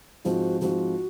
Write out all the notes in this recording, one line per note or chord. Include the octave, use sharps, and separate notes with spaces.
G#2 F3 C4 F4 F#4
G#2 F3 C4 F4 F#4